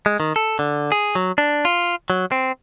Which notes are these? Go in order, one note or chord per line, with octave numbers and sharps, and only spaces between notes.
G#3
D#3
A4
D3
G#4
F#3
D4
F4
F#3
C4